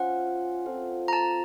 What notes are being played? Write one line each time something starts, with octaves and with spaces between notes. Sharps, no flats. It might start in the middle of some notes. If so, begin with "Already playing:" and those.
Already playing: C#4 F4 C5 F#5
C4 F4 A4
A#5
A5